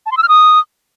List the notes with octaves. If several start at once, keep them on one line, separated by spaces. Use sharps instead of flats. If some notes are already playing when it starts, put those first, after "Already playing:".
A5
C6
E6
F6
D#6